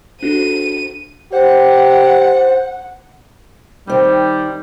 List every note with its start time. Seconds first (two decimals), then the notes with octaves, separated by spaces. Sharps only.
0.23 D4 F#4 A4 D#7
1.32 G4 C5 F#5
3.87 D#3 G3 C4 D#4